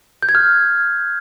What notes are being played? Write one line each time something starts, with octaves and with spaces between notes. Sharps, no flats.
G6
G#6
F6